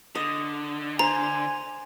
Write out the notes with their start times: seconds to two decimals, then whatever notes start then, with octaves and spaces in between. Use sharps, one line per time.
0.15 D3 D#5
0.99 C5 G#5 A#5